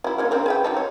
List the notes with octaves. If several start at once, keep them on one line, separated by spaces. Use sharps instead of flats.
F#3 E4
A#3 C#4 A#4
C4 D4 A#4
G#4 B4 G5
F#3 D#4 A4
C#5